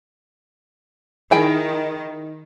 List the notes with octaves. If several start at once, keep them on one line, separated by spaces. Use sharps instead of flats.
D#3 E4 G#4 G5